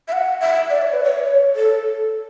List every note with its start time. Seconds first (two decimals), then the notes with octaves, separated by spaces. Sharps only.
0.08 E5
0.13 F#5
0.41 E5
0.70 D5
0.82 C#5
0.93 B4
1.04 C#5
1.56 A4